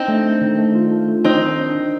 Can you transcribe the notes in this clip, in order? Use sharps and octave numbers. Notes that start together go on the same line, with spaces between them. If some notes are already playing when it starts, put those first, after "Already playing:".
Already playing: C4 D4 D#4
A3
A3
D#3
A3
F4
A3
A3
D#3 C4 D#4
D#3
D4
D#3